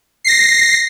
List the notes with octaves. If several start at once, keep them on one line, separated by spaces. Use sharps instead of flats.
A#6 C7